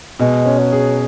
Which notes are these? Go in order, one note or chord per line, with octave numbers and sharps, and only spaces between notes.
B2 G#3
C#4
F#3
G#4